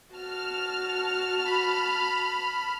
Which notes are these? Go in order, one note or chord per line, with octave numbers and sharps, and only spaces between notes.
F#4 A5 F6
B5